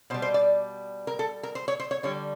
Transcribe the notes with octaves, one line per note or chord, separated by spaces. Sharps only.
B2 G3 C5
C5
D5
A#4
A4
A#4
C5
C#5
C5
C#5
D3 G3 C#5